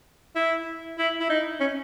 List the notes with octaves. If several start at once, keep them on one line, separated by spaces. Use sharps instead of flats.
E4
E4
E4
D#4
C#4